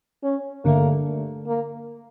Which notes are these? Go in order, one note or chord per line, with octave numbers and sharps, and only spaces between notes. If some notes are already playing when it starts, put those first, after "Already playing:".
C#4
G2 D3 A3 A#3
A#3